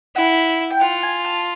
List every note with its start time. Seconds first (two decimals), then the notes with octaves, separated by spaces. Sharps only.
0.16 E4 F#5
0.70 G5
0.81 F4 F#5
1.03 G#5
1.25 A5